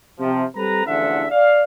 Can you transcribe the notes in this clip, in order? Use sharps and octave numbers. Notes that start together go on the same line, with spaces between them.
C3 F3
G3 C4 A4 B4 A#5
A1 E2 D3 F3 E5 F#5
D5 F5